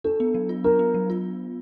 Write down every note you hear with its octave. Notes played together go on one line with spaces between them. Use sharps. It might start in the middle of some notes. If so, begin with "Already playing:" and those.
D4 A4
B3
F#3
F4
D4 A#4
B3
F#3
F4